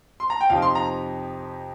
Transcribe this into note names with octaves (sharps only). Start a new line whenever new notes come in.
C6
A#5
G5
F2 C3 F3 D#4 F5
C6
A#5